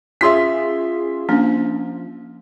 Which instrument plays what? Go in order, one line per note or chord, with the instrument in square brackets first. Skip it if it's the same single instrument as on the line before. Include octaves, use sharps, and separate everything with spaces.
[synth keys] C#4 F4 G#4 [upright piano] E5 C6 B6
[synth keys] F3 [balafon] A#3 C#4 D4